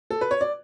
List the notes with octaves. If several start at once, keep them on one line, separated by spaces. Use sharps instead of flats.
A4
B4
C#5
D5